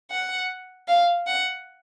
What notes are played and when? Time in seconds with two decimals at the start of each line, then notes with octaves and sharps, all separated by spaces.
0.11 F#5
0.88 F5
1.27 F#5